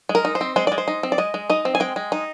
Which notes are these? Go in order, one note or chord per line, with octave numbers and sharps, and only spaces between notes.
G#3
A#4
D#4
C5
C4
G#3 C5
G#3 D5
C5
D#4
C4
D5
G#3 D#5
G#3
D#4 D#5
C4
G#5
G#3 G5
G#3
D#4